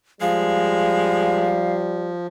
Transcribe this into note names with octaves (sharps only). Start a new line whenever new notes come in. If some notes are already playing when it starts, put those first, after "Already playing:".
F3 G3 G#3 F5